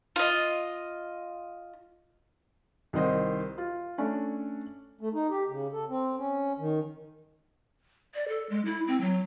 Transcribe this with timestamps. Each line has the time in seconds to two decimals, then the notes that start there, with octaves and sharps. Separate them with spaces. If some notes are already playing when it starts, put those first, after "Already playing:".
0.16 F4 D#5
2.93 C2 D#3 D#4 C5 D#5
3.58 F4
3.98 A3 C#4 D4
5.01 A3
5.14 D#4
5.30 G4
5.49 C#3
5.73 A4
5.89 C4
6.18 C#4
6.59 D#3
8.15 D5
8.28 A4
8.50 G#3
8.65 E4
8.88 C4
9.01 F#3